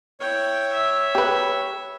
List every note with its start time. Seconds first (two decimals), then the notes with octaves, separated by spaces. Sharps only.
0.20 E4 C#5 G5
0.72 E5
1.15 G4 B4